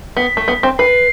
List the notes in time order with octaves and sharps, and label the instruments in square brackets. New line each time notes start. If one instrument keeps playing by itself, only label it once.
[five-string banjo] B3 [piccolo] B6
[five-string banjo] A3
B3
C4
[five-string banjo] B4 [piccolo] C7